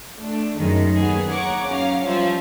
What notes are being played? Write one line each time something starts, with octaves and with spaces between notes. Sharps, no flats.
A3 D4
F#2 A2 D#3 G#3 D#4
D#2 D#3 B3 G#4
C#5 F#5 A#5 C#6 D6
F#2 C#3 C#4 F5 A#5
F3 G3 C#4 C5 E5